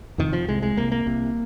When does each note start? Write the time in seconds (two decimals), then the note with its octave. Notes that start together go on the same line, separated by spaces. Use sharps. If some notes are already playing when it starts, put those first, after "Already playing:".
0.18 F2 C3 D#3
0.33 F3
0.47 C2 C3 G#3
0.62 G#3
0.77 C2 C3 A#3
0.92 A#3
1.06 C2 C3